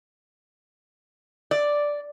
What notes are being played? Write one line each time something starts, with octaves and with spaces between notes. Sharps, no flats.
D5